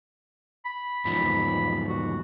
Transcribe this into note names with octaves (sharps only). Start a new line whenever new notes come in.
B5
E2 G#2 F3 B5
F#4